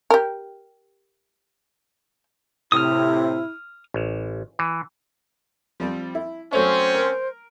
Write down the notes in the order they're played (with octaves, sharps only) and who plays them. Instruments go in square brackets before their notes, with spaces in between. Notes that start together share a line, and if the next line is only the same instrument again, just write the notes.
[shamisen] G4 A#4
[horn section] A2 C3 [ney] E4 [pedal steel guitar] D#6 F6
[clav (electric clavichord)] A1
E3
[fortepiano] F3 G3 C4
E4
[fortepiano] F#3 A3 C#5 [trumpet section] C4 C#4 [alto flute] C5
[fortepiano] A#4